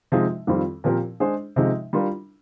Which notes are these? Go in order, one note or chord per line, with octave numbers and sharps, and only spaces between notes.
C3 F3 G#3 D#4
F2 D#3 G3 C4 F4
A#2 F3 C4 G4 A#4
G#3 D4 G#4 C5
C3 F3 G#3 D#4
G3 D4 F4 A#4